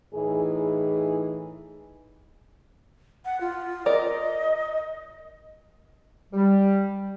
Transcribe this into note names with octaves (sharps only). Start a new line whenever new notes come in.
A2 E3 D#4 G#4
F#5
F4
A#4 D5 D#5
G3